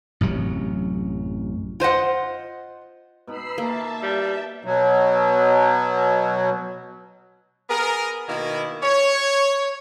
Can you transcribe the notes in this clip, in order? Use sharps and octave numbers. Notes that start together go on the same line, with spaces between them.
A1 F#2 C3 F#3
F4 C5 D#5 F#5
B2 D#4 B5 E6 C7
A#3 E5 A5
G3
B2 F#3
B3 G#4 A#4
B2 D#3 A#3 E4
C#5